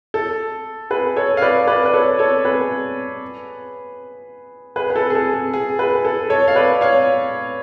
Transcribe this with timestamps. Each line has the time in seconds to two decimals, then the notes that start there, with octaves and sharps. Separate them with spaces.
0.14 A4
0.90 G#4 B4
1.16 A4 C#5
1.37 F5
1.42 B4 D5
1.67 B4 D5
1.85 B4
1.94 A4 C#5
2.19 A4 C#5
2.45 G#4 B4
4.76 G#4 B4
4.90 B4
4.96 A4
5.10 G#4
5.15 A4
5.33 G#4
5.54 G#4
5.79 G#4 B4
6.05 A4
6.30 A4 C#5
6.48 F5
6.56 B4 D5
6.81 C#5 F5